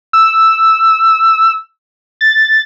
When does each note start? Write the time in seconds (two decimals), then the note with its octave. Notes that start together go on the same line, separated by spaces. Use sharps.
0.13 E6
2.21 A6